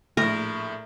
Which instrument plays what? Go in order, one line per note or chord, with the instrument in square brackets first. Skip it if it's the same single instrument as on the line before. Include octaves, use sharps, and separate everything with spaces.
[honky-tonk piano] A#1 A2 [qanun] A#4